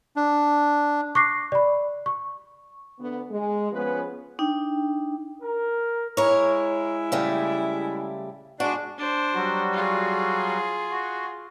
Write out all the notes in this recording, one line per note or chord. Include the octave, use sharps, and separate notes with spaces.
D4
C#6 D6 F#6 A#6 C7
D5 B5
C#6
D2 B3
G#3
F3 B3 C#4 G#4 B4
D4 D#4 G5
A#4
G#3 E4 A#4 C#5
C#3 G3 A3
G#3 D4 F#4
D4 C5
F#3 G3 F#4
F4 G#4
F#4